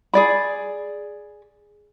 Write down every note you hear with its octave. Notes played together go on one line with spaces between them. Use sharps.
G#4 D5 B5